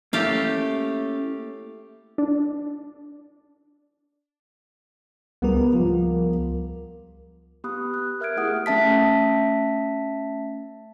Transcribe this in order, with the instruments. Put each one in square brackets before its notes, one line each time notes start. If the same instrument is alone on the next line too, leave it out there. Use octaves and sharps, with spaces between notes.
[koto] A3 G4 F5 [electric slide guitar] A#3 C#4 E4
[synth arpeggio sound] D4
[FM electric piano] C#2 G3 A#4 [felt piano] B3
[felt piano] F3
[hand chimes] B3 G4 B5 D#6 F#6
F#6
A#4 E5 F6 F#6 G#6 D7
A3 E4 G4 G#4 F#5 D#6
A3 C#4 E5 A5 B6